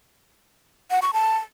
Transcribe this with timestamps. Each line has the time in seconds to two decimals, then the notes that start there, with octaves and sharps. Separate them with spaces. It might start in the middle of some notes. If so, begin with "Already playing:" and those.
0.91 F#5
1.02 C#6
1.13 A5